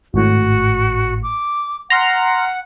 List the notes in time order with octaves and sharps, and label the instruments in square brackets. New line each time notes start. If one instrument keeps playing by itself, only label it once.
[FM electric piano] G#1 A2 [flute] F#4
[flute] D6
[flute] F#5 [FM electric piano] A#5 C6 F6